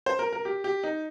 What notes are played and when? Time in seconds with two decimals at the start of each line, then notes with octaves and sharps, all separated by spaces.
0.06 C5
0.19 A#4
0.33 A#4
0.45 G4
0.64 G4
0.84 D#4